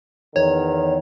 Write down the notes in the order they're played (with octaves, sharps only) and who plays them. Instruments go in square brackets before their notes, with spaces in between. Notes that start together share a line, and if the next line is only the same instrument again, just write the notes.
[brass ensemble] E2 D#3 [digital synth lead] C#5